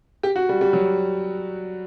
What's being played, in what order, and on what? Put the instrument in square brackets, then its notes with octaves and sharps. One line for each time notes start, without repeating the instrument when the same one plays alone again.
[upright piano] G4
F#4
G3
G3
F#3